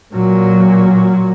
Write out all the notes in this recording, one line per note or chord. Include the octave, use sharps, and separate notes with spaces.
A#2 F#3